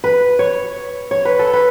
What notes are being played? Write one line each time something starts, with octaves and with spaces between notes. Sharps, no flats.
B4
C#5
C#5
B4
A4
B4